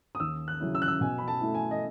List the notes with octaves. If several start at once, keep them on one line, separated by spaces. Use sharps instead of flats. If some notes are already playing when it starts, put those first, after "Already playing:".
D#6
D#2 E6
F#6
C#3 F#3 C#4 E4
E6
F#6
E6
B2 G#5
B5
A5
A3 E4
G#5
D#5